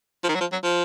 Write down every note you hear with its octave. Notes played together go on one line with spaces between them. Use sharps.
F3
D#3
F#3
F3
F#3
F3